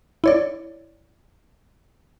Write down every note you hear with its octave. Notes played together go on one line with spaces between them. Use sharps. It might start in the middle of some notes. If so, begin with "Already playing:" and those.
E4 C#5 D5